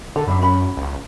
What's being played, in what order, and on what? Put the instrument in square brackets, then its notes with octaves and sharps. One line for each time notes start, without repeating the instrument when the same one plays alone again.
[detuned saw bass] D3 [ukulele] A4
[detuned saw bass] F#2 [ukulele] D4 E5 B5
[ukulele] C#4 F#4 B5
[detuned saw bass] C#2